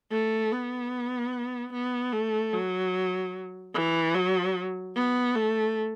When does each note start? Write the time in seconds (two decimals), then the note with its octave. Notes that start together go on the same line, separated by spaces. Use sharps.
0.12 A3
0.52 B3
1.73 B3
2.13 A3
2.53 F#3
3.74 E3
4.14 F#3
4.95 B3
5.35 A3